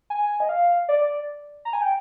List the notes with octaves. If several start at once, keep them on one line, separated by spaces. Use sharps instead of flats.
G#5
D#5
F5
D5
A#5
G#5
G5